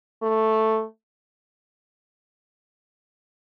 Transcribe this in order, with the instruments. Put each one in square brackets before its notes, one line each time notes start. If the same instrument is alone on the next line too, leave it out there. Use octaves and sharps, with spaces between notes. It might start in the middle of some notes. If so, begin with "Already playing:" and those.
[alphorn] A3